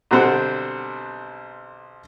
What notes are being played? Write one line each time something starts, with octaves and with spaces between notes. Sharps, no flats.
B1 D3 G3 C4 C5 F#5